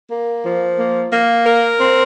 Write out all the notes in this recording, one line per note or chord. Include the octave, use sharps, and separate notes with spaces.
A#3
F3
A#3
A#3
A#4
C4